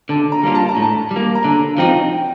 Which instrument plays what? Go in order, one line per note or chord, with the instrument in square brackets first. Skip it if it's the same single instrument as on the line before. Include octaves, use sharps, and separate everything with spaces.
[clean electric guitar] D3 [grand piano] A5
[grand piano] A#5
[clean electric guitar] G3 A#3 D4 F4
[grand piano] A5
A#5
[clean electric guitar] A2
[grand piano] A5
[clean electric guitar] G3
A#3
[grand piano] A#5
[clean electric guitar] D3 [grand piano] A5
[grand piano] F5
[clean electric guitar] F3 C4 D#4 [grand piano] G5
[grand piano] G5